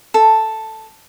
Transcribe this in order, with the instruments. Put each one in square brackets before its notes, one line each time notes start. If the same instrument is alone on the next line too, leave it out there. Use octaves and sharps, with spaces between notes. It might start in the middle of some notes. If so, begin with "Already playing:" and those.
[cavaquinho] A4